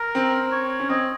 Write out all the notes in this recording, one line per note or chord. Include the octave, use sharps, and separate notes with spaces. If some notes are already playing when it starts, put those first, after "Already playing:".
Already playing: A#4
C4
C#5
C#4
C4 D#5